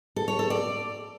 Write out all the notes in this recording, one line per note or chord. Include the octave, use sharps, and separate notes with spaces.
A4
C#5
A4
D5